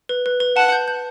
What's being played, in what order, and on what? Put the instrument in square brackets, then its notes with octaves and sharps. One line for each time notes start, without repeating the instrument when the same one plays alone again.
[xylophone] B4
B4
B4
[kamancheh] F#5 [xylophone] A5
[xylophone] G6
G6